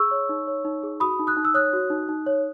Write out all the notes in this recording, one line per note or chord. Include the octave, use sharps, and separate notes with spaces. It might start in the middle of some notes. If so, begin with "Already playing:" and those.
Already playing: G#4 C#6 E6
C#5
D#4
C#5
D#4
G#4
F#4 B5 D#6
D#4
D#6 F#6
D#4
E6
C#5 D#6 F#6
F#4
D#4
D#4
C#5